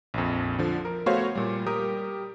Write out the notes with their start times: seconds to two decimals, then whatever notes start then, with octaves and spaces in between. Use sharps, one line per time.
0.14 A#1 F2
0.59 D3 F3
0.85 A#4
1.06 A3 B3 F#4 C5 C#5 F5
1.35 A#2 G3
1.66 G3 G4 A#4 D#6